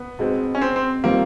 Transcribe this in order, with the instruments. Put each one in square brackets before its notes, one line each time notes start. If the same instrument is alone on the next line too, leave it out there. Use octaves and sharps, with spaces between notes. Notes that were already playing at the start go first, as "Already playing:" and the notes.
Already playing: [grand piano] B3
[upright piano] B2 G#3 C4 D#4
[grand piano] C#4
C4
C4
[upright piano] D#3 G3 C4 F4 [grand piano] A#3